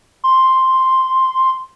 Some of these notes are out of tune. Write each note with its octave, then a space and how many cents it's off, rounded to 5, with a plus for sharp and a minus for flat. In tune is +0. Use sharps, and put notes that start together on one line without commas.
C6 +0